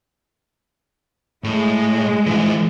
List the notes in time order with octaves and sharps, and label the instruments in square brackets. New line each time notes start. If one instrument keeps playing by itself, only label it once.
[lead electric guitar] A2 [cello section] G#3
[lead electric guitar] E3 F4